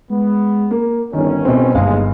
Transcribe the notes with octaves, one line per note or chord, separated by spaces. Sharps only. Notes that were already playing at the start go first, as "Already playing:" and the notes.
G#3 B3
A#3
G1 D#3 C#4
B2 C4
G1 D#2 G3 G#3 F5